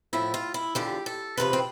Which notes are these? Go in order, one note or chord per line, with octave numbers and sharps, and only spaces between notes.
A2 F3 E4
F4
E4
E2 D3 F3 G4
A4
E2 C3 F3 B4
C4